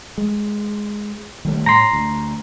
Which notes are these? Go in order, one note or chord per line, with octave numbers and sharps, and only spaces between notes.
G#3
D#3 G3 A3
A2 A#5 C6
D2